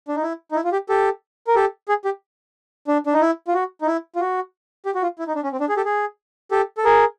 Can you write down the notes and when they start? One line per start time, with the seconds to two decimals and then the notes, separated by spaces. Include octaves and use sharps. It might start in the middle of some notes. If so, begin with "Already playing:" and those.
0.08 D4
0.16 D#4
0.23 E4
0.52 D#4
0.56 E4
0.64 F4
0.72 G4
0.89 G4 A4
1.47 A#4
1.55 G4 A4
1.89 G#4
2.05 G4
2.88 D4
3.06 D4
3.14 D#4
3.21 E4
3.48 F4
3.54 F#4
3.81 D#4
3.87 E4
4.16 F4
4.20 F#4
4.86 G4
4.95 F#4
5.03 F4
5.19 E4
5.28 D#4
5.36 D4
5.43 C#4
5.52 C4
5.60 D4
5.69 G#4
5.77 G4 A4
5.85 G#4
6.51 G4 A4
6.78 A4
6.85 G#4 A#4